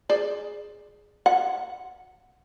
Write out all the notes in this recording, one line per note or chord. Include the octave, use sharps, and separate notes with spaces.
G#4 C5 D5
F#5